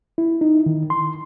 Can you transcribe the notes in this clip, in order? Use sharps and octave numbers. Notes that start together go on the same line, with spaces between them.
E4
D#4
D#3
C6